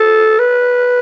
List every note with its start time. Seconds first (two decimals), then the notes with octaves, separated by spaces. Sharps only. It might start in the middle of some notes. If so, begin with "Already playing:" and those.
Already playing: A4
0.39 B4